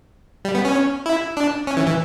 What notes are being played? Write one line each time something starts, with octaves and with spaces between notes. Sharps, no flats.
G3
B3
C#4
E4
D4
C#4
E3
E3